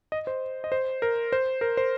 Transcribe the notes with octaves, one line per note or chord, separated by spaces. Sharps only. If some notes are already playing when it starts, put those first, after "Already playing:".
D#5
C5
D#5
C5
A#4
C5
A#4
C5